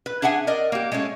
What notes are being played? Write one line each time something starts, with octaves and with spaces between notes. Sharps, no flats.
B4
D4 G#4 E5 F#5 G#5
A#4 D5 D#5
A#3 G4
G#3 A3 C#4 C#5